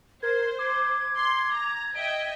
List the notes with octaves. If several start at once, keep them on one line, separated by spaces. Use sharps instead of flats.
A#4 C5 G#6
D6 G#6
C6
A#5
D#5 E5 G5 D7